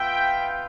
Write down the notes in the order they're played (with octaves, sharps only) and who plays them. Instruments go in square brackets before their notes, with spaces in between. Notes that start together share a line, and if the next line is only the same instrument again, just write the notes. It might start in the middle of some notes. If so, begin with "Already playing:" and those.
Already playing: [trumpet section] B3 F4 E5 G5